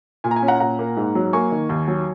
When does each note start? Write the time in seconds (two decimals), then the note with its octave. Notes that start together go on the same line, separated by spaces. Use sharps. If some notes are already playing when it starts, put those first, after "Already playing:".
0.24 A#2 G#5
0.31 A#5
0.36 G#5
0.42 C#4
0.48 F#5 A#5
0.60 A#2 F#5 A#5
0.79 A#3
0.97 G#2
1.15 F#3
1.33 A#3 G#5 C#6
1.51 D#3
1.69 D#2
1.88 F#3